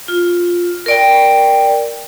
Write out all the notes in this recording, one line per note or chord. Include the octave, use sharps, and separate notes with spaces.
F4
A#4 D5 G5